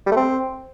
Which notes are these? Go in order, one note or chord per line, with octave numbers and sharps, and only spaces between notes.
G3
A3
C4